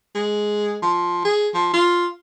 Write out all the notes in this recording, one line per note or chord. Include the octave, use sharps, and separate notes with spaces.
G#3
F3
G#4
F3
F4